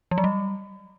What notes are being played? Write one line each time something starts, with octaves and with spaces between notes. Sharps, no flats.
F3
F#3
G3